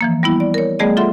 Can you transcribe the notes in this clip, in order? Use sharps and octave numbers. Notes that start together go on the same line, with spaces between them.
E3 F3 A#3
G3 B3 E4
D5
A#4 C#5
G3 A3 B3 G#4 D5 D#5
F4 A4 E5 F#5 C6